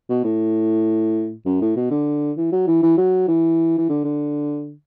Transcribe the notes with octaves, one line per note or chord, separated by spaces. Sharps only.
B2
A2
F#2
A2
B2
D3
E3
F#3
E3
E3
F#3
E3
E3
D3
D3